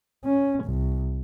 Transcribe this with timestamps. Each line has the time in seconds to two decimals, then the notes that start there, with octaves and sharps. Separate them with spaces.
0.25 C#4
0.64 C2